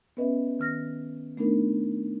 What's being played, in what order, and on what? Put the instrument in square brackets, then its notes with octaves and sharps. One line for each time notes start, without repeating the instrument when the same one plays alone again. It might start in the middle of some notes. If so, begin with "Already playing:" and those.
[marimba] B3 C#4 B4 D#5 E5
D#3 F6 A#6
A3 B3 D4 D#4 A#4